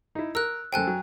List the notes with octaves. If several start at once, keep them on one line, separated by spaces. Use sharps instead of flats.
D#4 E4
A#4 E6 F#6
F#2 A4 C5 G5 G#5 F#6
F#3